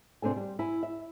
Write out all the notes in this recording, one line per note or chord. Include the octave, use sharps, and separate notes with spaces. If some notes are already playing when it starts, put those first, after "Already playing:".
C3 C4 D4 A4 G#5
G3
E4 G#5
E5